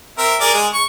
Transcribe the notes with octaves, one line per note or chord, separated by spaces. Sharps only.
C4 A#4 E5
G#4 A#4 D5
G#3 G#4
C#6